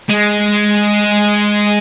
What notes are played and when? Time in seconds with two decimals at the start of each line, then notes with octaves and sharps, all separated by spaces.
0.09 G#3